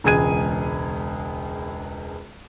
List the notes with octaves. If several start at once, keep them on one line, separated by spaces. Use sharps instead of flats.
E1 C#2 G#4 G#6 D#7